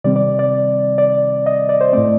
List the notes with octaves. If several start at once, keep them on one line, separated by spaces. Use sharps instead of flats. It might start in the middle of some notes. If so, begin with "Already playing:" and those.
C3 D#3 G3 C4 D5
D5
D5
D5
D#5
D5
C5
A2 A3 C4 D5